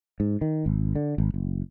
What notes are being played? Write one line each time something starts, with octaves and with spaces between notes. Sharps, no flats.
G#2
D#3
G#1
D3
G#1
F#1